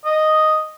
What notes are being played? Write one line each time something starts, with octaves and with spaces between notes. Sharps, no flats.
D#5